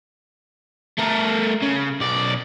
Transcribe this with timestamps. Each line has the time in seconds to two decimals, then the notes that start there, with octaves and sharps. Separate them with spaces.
0.98 A3 A#4
1.62 C#3
2.00 B1 D5